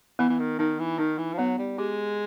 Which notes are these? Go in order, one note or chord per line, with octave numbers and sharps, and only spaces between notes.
E3 B3
E3
D#3
D#3 D#4
E3
D#3 D#4
E3
F3
F#3 B3
G3
G#3 G4